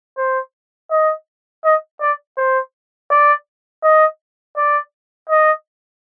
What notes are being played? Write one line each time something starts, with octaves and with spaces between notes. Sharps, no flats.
C5
D#5
D#5
D5
C5
D5
D#5
D5
D#5